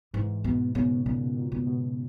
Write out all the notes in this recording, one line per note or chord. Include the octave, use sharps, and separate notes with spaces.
G#2 E3
B2 B3
C#3 B3
A#2 B3
A#2
B3
B2